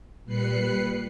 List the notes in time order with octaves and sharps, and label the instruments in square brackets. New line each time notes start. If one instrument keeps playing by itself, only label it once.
[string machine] A#2 G3 B4 F#6 C7 C#7